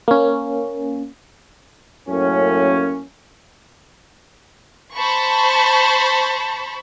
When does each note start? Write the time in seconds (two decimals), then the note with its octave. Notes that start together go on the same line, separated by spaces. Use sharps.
0.08 A#3 C#4
2.09 F#2 A2 A#3 C#4
4.95 C5 A5 B5 C#6